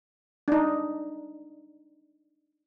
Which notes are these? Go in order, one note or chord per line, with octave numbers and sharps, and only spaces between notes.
D4 D#4